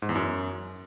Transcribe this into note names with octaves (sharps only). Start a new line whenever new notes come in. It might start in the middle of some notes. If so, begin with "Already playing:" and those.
G#2
E2
F#2